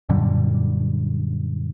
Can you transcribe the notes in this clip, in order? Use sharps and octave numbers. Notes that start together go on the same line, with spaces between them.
F#2 A#2 D3 G3